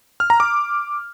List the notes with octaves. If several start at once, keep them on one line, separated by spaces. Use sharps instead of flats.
F6
A#5
D6